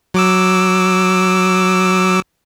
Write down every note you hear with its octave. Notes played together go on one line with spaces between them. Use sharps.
F#3 D6 E6